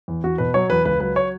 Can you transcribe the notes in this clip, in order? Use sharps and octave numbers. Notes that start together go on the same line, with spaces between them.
E2
E2 F#4
B2 B4
F#3 C#5
E2 B4
C#2 B4
F#3 B4
C#5